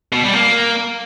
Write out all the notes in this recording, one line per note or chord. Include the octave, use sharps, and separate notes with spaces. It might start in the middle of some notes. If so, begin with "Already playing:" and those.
B2
G3
A#3